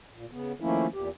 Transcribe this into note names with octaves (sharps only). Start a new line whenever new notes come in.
A#2
C#3 B3
D#3 F3 A3 A#3 C#4 E4
E2 A#2 G4